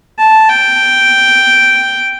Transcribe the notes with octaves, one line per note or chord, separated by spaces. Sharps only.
A5
G5